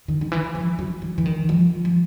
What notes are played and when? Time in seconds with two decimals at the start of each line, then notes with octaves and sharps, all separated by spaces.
0.08 D#3
0.21 D#3
0.32 E3
0.55 F3
0.79 F#3
1.02 E3
1.18 E3
1.26 D#3
1.49 F3
1.85 F3